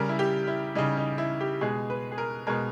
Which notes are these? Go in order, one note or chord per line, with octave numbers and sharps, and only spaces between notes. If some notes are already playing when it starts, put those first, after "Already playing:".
Already playing: C#3 G3 A#4
E4
G4
E4
C#3 G3 D#4
D#4
E4
G4
B2 G#3 G#4
B4
G#4
A#4
B2 G#3 A#4